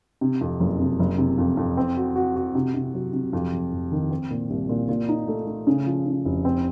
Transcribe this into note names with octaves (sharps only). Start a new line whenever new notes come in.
C3
F2
F#1
C3
F#1
C3
F2
F2
C4
F#4
F#4
F#4
C3
C3
F#3
C3
F2
F1
F1
D#3
C4
A#2
C2
A#2
A#2
D#4
A3
A3
C#3
F3
C#3
F1
C4